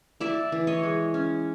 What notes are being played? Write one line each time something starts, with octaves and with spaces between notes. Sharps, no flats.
E4 D5 E5
E3
C#5 D#5
G#3
C#4